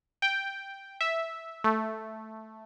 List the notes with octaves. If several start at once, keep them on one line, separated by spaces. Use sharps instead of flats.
G5
E5
A3